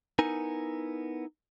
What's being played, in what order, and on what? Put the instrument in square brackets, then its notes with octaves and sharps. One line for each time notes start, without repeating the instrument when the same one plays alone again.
[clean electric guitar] B3 D#4 E4 A#4 G#5